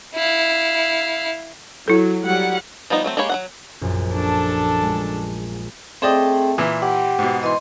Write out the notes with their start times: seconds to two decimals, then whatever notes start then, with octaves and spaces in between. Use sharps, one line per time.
0.15 E4 F5
1.88 F#3 E4 A4
2.25 F#3 G3 F#5
2.90 F3 G3 B3 D#4
3.04 F#3 A3 C4
3.17 G#3 A#3 G4 C#5 B5
3.29 F#3 C#4 F#5
3.81 A#1 F#2
4.13 D4 A4
4.82 G#3
6.02 A3 C4 G#4 C5 D5 D#5 G5
6.58 A#2 E3 E5
6.82 G4 F#5
7.19 G#2 B2
7.43 E3 D#5 C6